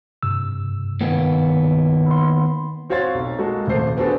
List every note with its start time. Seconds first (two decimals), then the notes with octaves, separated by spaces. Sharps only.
0.23 G2 C3 E6
1.01 D#2 A#3 B3
2.06 B5 C6
2.90 C4 F#4 C#5 F5 C6 A6
3.15 B1
3.38 G#3 A#3 F#4 A4
3.67 D#1 C2 A3 A4 C5 C7
3.97 B3 C4 D4 F#4 G#4 A4